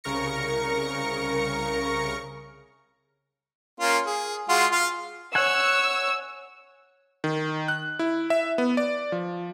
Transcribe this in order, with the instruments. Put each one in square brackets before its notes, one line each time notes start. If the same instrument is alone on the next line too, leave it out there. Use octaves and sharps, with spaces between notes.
[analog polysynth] C2 C#3 A#4 C#6 A#6 C#7
[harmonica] A#3 C#4 F4
G#4
G#3 F4 F#4
F4 F5
[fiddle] C#5 [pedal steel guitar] F#5 G#5 [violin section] E6
[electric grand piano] D#3
F#6
E4
E5
B3
D5
F3